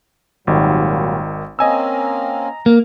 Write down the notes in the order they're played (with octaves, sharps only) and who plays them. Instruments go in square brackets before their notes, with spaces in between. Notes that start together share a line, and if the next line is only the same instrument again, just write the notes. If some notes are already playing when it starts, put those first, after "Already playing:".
[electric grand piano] G#1 D#3 [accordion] A#2 F#3 G3
[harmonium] A#3 C4 C#4 [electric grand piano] D#5 G#5 E6 [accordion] A#5
[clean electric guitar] A#3